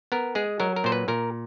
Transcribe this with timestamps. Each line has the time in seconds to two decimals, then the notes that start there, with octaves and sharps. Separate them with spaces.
0.12 B3 A#4
0.35 G#3 G#4
0.60 F#3 A#4
0.76 A#4
0.84 A#2 C5
0.92 B4
1.08 A#2 A#4